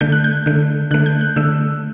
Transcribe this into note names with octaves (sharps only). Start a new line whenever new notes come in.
D3 A3 G6
F#6
G6
D3 A3
D3 A3 F#6
G6
F#6
D3 A3 E6